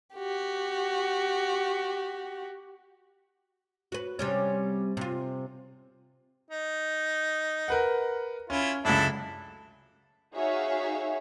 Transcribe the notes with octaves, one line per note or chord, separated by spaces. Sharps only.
F#4 G4
F#4 B4
C3 G3 C#4
C3 F4
D#4
A#4 B4 F#5
C#4 E4 F4
C#2 F#2 D4 E4 A4
D#4 F#4 G#4 C#5 E5 F5